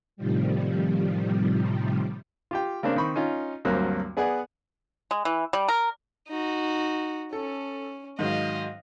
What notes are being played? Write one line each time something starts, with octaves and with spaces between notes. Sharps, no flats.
A2 C3 D#3 F3 G3
F4 G4 G5
C#3 A#3 C4 D4
D#3 C4 B5 C#6
C#4 D#4 F4
D2 G2 F#3 A#3 C4
B3 G#4 D5 F#5 G#5
G#3
E3
G3
A#4
D#4 F#4
C#4 A4
G#2 D#3 F#3 D#5 F5